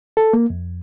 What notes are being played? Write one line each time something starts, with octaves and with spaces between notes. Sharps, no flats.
A4
A#3
F2